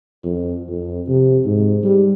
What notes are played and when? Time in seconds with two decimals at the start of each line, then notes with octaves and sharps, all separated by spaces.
0.24 F2
0.69 F2
1.08 C3
1.45 G#2
1.83 G3